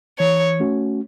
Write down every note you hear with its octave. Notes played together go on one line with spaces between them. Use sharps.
E3 C#5
A3 C#4 F#4